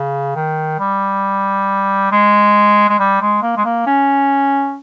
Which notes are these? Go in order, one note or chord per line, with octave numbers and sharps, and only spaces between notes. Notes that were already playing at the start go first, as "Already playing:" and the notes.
Already playing: C#3
D#3
G3
G#3
G#3
G3
G#3
A#3
G#3
A#3
C#4